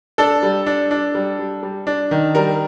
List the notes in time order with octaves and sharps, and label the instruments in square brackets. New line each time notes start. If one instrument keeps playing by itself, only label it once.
[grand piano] D4 A4
G3
D4
D4
G3
G3
G3
D4
D#3
G3 A#4